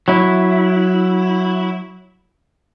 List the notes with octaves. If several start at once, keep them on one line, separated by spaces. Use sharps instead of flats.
F#3 E4